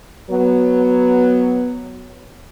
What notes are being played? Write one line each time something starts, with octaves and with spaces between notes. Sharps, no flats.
F#3 B3